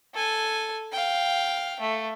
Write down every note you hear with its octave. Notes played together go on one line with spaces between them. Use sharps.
A4 G#5
F5 G5
A3